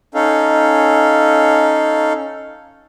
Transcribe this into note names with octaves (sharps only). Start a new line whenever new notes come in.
C#4 D#4 A4 F5